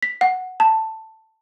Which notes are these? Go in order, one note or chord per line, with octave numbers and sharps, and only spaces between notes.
B6
F#5
A5